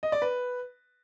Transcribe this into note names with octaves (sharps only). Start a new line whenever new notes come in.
D#5
D5
B4